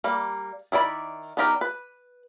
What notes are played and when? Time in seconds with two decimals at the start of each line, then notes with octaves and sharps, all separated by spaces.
0.04 G3 A#3
0.72 D#3 E4 D5 B5
1.37 B3 D4 D#4 G4 A#4
1.61 B4